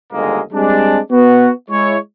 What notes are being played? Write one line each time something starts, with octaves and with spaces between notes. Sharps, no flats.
G1 D#2 D3 G#3 A#3 D#5
G3 G#3 C4 D4
B3 F#4
G#3 E4 C#5